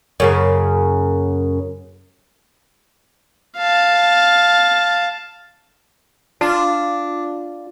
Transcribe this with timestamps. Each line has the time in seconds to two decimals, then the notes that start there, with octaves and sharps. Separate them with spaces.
0.20 F#2 C#3 A#3
3.57 F5 A5
6.41 D4 F4